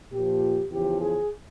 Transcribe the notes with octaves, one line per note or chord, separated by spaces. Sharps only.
A#2 F3 G4
E2 C#3 F3 G4
G#4